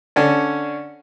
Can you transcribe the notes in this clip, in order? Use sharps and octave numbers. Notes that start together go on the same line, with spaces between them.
D3 C#4 D4